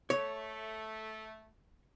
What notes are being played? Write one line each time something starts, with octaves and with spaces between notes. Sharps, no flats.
A3 C#5